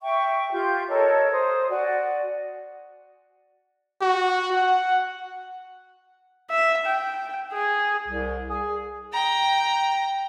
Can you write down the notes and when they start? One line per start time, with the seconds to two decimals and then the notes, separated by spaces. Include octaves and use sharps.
0.01 E5 G5 C#6
0.52 F4 G4 G6
0.89 A4 A#4 C#5 D#5
1.32 C5 D#6
1.69 F#4 D5 G#5
4.01 F#4
4.53 F#5
6.51 E5
6.86 G5
7.52 G#4
8.07 C2
8.49 G#4
9.13 G5 A#5